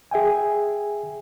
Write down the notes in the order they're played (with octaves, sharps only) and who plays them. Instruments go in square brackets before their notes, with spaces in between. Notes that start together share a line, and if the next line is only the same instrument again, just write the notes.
[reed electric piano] G#4 E5 G5 G#5